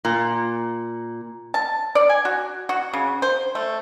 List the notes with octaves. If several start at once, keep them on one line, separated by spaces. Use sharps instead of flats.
A#2
A5
D5
G#5
F#4
F#4
C#3
C5
A3